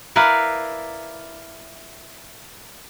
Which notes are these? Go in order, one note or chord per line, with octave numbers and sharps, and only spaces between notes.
E4 A#4 B4 D5 F5